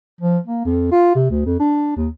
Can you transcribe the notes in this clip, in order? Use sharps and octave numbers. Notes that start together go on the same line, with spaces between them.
F3
A#3
F2
F4
C3
D2
F2
D4
D#2